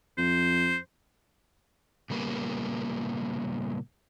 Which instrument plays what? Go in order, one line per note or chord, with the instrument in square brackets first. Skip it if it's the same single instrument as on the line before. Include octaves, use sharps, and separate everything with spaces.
[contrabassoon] F2 [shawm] C5
[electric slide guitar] A#2 C#3 G3 A#3 B3